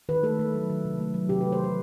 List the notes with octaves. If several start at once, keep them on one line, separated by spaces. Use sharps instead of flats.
D#3 B4
A3 A4
A3
F#3
D#3
C3
A3
F#3
C3 G4
A3 B4
C5
E3 B4